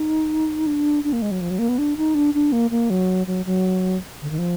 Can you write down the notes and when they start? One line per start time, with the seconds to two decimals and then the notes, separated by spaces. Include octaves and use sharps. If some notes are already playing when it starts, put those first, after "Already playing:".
Already playing: D#4
0.67 D4
1.04 D4
1.13 A#3
1.22 G#3
1.31 F#3
1.41 F3
1.51 F#3
1.59 A#3
1.69 B3
1.78 D4
1.97 D#4
2.15 D4
2.34 D4
2.52 A#3
2.71 A#3
2.90 F#3
3.27 F#3
3.46 F#3
4.22 D3
4.30 D#3
4.38 F3